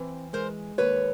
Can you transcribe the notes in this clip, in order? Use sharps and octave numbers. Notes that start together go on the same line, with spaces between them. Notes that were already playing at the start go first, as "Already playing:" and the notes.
Already playing: E3 C4
G#3 A#4 C5
D#2 B4 C#5